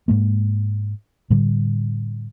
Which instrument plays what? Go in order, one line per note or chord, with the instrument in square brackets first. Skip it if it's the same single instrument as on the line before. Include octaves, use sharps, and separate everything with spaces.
[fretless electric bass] G#2 G#3 A#3
A2 D3 G3